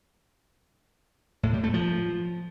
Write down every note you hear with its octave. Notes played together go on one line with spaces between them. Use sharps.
A2
G3
A3
F3